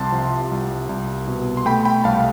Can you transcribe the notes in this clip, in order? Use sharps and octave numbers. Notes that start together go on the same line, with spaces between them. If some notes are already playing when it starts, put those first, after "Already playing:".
Already playing: C2 C3 A5 C6
F3
C2
C2
B2
C6
A3 G5 B5
G5 B5
C2 F5 A5